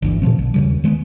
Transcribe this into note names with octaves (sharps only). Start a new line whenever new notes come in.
G1 D2 E3
A#2 E3 F3 C4
A#1
D#2 C#3 G3
D#3 G#3 A3 B3